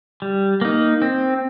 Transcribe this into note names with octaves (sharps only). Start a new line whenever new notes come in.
G3
A#3 D#4
C4